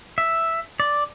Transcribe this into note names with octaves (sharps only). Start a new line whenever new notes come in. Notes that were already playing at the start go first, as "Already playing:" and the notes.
E5
D5